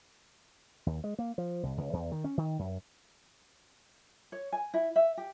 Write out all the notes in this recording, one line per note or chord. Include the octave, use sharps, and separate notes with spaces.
D#2
G#3
A#3
F3
C2
C#2
E2
D#3
C#4
D#3
F#2
C#5
G#5
E4
E5
G4